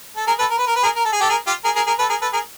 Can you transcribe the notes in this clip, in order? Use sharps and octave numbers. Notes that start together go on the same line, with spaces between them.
A4
G#4 A#4
A4 B4
A#4
B4
A#4
B4
G#4 A#4
A#4
A4
G#4
G4 A4
G#4 A#4
F4 G4
G#4 A#4
G#4 A#4
G#4 A#4
A4 B4
G#4 A#4
A4 B4
G#4 A#4